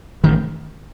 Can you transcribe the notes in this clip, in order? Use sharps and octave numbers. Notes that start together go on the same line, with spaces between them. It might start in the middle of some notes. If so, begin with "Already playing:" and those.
A1 D#3